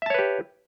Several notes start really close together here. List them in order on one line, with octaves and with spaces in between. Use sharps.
E5 A5 C#5 B4 G4